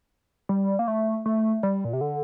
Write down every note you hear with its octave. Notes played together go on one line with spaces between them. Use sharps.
G3
A#3
A3
A3
G3
A#2
C3
D3